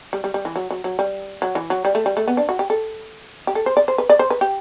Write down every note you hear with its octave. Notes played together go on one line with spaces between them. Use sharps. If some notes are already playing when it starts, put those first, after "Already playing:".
G3
G3
G3
E3
F#3
F#3
F#3
G3
F#3
E3
F#3
G3
A3
G3
A3
B3
D4
F#4
G4
A4
G4
A4
C5
D5
C5
B4
D5
C5
B4
G4